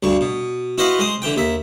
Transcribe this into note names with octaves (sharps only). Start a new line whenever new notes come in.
D2 G2 C#6
B2
E4 F#4 B4 C5 D#5 F5
G#3 C5 D#6
D3 E3 G5
D#2 E5